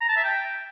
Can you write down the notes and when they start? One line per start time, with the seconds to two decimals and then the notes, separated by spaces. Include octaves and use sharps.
0.01 A#5
0.09 A5
0.17 E5
0.24 G5